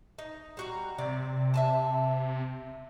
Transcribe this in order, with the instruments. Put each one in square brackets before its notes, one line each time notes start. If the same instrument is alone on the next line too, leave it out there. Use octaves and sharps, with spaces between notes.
[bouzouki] D#4
G3 F#4 A#5
[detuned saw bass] C3 [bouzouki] D5
[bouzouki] E5 G#5 A5